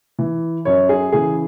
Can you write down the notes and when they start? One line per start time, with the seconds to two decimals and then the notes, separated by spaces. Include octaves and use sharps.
0.19 E3
0.65 F#2 C#5
0.89 G#4
1.12 C#3 E3 G#4